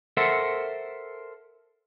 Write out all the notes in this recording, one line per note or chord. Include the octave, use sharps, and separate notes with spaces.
A4 A#4 C5 E5 F#5